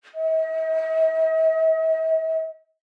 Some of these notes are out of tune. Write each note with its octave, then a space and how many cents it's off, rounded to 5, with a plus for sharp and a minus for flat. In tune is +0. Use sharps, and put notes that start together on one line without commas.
D#5 +45